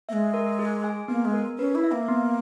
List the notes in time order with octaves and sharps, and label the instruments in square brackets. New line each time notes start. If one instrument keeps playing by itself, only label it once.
[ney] A#3 [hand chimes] E5
[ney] G#3
[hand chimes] A#4
G#4
G#5
[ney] A#3 [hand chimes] B3
[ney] G#3
[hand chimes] A#4
[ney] C#4 [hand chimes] B4
[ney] E4
[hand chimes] E5
[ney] A#3
[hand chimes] B3